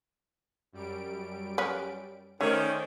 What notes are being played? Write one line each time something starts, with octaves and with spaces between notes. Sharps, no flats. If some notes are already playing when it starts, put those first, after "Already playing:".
F#2 G3 D7
C#4 B4
D#3 A3 C#4 C5 D5 G5